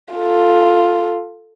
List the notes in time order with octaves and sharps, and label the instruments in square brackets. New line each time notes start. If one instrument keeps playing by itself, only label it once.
[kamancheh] F4 A4